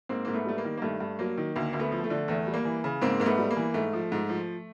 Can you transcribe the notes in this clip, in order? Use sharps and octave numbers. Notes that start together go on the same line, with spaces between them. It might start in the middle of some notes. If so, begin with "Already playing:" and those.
G#2 A#3 C4
G#2 A#3
A3 B3
G3 A3
A#3
D#3
A#3
G2 A3
G2
F#3 A#3
D#3
D2 A#3
D2 A#3
A3 B3
F3
A3
D3
E2 A3
G3
A#3
E3
C#3
G#2 A#3 C4
G#2 A#3
A3 B3
G3
A#3
E3
G#2 A3
F3
G#2
F3